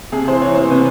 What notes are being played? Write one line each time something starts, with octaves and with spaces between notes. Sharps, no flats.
C3 G#4
E3 C5
E3 C#5
C3 C5
C3 B4